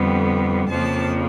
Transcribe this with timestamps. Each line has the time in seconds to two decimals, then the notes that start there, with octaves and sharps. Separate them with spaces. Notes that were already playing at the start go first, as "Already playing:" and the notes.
Already playing: F2 D3 G3 B3
0.69 F2 C#3 F3 A#3 A5